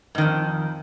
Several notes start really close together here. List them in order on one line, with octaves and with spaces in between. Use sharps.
G#2 D#3 F2